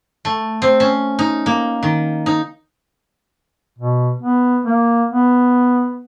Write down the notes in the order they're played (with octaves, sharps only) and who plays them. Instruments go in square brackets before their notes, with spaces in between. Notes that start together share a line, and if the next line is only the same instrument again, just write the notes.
[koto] A3
C4
C#4
D#4
A#3
D#3
D#4
[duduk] B2
B3
A#3
B3